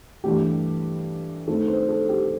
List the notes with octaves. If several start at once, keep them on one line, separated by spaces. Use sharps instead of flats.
G2 E3 A3 G4
G2 D#3 A3 C4 A4
C5
A4
G4